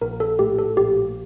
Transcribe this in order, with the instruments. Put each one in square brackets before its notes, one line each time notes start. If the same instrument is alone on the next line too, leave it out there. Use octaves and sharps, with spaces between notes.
[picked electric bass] A#1 [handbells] A#4
[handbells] A4
[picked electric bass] A2 [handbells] G4
[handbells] A4
[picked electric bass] A#1 [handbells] G4